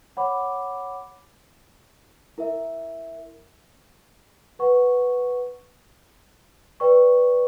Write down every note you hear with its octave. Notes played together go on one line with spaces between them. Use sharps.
C#5 F#5 B5 D6
E4 A#4 E5
B4 F#5 C#6
B4 D5 G5 C#6